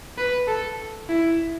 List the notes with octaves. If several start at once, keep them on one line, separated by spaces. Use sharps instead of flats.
B4
A4
E4